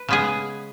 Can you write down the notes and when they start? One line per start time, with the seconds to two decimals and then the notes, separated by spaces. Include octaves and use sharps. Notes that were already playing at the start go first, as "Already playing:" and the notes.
Already playing: B4
0.09 C#3 G#3 B3 G#4